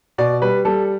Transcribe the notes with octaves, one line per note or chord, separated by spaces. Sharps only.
B2 D5
G3 B4
G3 A4